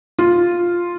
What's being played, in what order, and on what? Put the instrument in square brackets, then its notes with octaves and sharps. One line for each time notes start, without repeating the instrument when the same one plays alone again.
[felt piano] F4